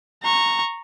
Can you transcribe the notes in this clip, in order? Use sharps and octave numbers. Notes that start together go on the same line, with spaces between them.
A#5 C#6